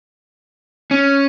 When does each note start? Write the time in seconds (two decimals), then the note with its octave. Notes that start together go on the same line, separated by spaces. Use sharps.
0.91 C#4